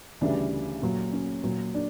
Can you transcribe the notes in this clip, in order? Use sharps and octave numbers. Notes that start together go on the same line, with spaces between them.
D2 C#3 E3 G3 D4
A#2 F#3
C#4
A#2 F#3
D4